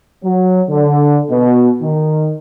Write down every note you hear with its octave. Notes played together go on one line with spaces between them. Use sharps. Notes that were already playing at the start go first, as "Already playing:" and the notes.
F#3
D3
B2
D#3